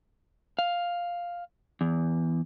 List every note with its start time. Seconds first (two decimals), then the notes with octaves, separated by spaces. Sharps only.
0.59 F5
1.81 E2